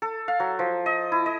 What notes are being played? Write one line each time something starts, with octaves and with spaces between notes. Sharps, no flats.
A4
F5
F#3
F3
D#5
E4
D#5